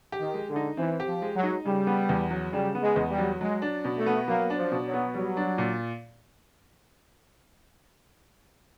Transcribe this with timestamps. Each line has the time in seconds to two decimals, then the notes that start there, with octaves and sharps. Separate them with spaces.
0.12 G4
0.20 D#3
0.34 G#3
0.49 D3
0.56 D#4
0.77 E3 C4
1.00 G4
1.07 F3
1.22 G#3
1.36 F#3
1.43 D#4
1.65 C#3 G3
1.87 B3
2.09 E2
2.31 F#3
2.53 C#3 G3
2.75 B3
2.82 G#3
2.96 E2
3.11 G3
3.18 F#3
3.40 F#3 G#3
3.62 D4
3.84 B2
3.98 A3
4.06 B3
4.28 F#3 A#3
4.50 D4
4.57 F3
4.72 B2
4.86 F#3
4.94 B3
5.14 F#3 G3
5.37 D4
5.58 A#2